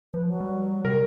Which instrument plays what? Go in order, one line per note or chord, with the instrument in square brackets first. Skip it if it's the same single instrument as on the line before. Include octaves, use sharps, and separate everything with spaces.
[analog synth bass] F3 [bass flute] B4
[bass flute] F#3
[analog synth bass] G3
[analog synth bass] C3 [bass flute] G3 [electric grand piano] A#4